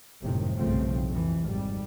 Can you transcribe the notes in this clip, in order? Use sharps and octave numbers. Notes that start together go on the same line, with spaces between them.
G1 F#2 A2 C3 D#3
B1 G2 C#3 F3 A3 C4
F2 C3 E3
G#1 G3